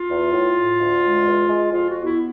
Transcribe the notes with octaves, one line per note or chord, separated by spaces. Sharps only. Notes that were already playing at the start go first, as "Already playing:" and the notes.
Already playing: F4
E2
A2
A2
D2
G#3
E2
G#3
F2 F4
F#4
B3
E4